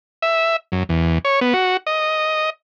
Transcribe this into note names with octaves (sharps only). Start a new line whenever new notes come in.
E5
F#2
E2
C#5
B3
F#4
D#5